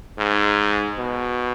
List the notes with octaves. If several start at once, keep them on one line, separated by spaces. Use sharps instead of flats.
G#2
B2